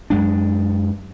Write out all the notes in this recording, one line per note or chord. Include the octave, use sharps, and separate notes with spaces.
F#2 G#3 D4